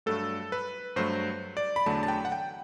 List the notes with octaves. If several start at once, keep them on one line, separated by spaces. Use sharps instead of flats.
G2 F#3 A3 A4
B4
G2 F#3 A3 C5
D5
B5
E2 D3 F#3 A3 A5
A5
G5
F#5
G5